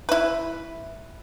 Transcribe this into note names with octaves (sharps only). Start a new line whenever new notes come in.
E4 B4